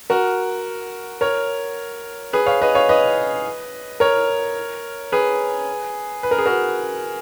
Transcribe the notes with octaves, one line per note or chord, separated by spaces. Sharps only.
F#4 A#4
A#4 C#5
G#4 B4
C#5 F5
B4 D#5
C#5 F5
B4 D#5
A#4 C#5
G#4 B4
B4
A#4
G#4
F#4 A#4